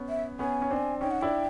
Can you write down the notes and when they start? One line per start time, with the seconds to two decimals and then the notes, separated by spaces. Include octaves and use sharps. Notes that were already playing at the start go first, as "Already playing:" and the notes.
Already playing: B3 C#4
0.09 E5
0.39 B3 C#4 G#5
0.62 C#4
0.71 C4 D4
1.01 C#4 D#4 G5
1.11 F#5
1.21 D4 E4 G5